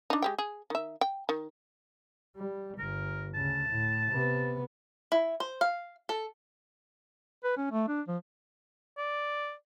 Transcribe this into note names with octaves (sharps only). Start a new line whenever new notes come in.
D4 D#4
G#3 G4 G5
G#4
D#3 E5
G5
D#3
G3
G1 A#4
D2 C#3 A5
A2
C3 B3
E4
C5
F5
A4
B4
C#4
A3
D4
F3
D5